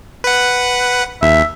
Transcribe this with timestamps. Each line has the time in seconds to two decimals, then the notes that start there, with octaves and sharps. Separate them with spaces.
0.24 B4 F#5
1.22 D#2 E5